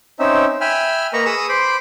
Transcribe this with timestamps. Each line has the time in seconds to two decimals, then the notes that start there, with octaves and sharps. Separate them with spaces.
0.19 C4 C#4 D#4 E5
0.61 E5 G5 G#5 B5 F6
1.13 A#3 B4 D#5 A#5 C#6
1.26 G#4 B4 C#6 D#6 E6
1.49 C5 B5 C6 D6